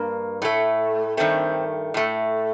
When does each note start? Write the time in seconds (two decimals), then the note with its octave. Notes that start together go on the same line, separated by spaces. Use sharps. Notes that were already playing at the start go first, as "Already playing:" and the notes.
Already playing: G2 A#3
0.42 A2 A3
1.17 G2 D#3 A3 C4
1.94 A2 A3